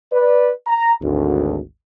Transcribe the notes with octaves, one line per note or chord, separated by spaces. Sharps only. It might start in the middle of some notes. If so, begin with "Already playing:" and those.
B4 D5
A#5
G#1 D2